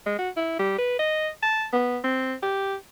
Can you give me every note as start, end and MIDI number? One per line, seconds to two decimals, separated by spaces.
0.06 0.15 56
0.19 0.30 66
0.37 0.55 64
0.59 0.78 55
0.79 0.95 71
0.99 1.29 75
1.43 1.65 81
1.73 1.99 59
2.04 2.34 60
2.43 2.75 67